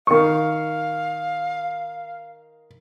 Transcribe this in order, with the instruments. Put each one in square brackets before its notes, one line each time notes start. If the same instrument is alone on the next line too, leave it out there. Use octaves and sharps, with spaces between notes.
[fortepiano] D#3 C#6 [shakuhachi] F5